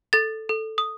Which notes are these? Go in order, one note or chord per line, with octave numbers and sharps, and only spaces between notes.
A4 A6
A4
D#6